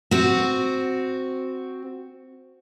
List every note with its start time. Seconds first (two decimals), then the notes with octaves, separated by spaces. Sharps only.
0.11 C4 F#4